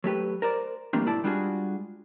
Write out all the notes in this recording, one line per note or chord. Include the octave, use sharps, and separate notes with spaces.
F#3 A3 G4 B4
A#4 C5 D5
E3 G3 A3 A#3 C4 D4
B1 G#2 E4 D5 A5
G3 G#3 D4 F4 F#4 G#4